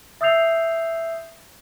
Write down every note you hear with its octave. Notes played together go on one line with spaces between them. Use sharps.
E5 D#6 E6 G6 C7 F7